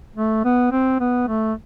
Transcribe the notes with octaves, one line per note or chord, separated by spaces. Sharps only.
A3
B3
C4
B3
A3